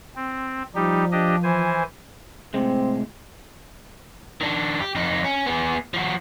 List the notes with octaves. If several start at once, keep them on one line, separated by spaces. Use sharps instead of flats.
C4
F3 G3 D#4 G4
D4 G4 D#5
E3 C5 G#5
A2 C3 G#3 C4
D#3 D4
G4
F2 D#4
C#4
B3 G#4
F3 F#4